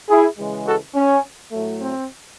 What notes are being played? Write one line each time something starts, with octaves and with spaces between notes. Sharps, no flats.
E4 G#4
C#3 E3 G#3
F#4 A4
C#4
A2 F#3 A3
C4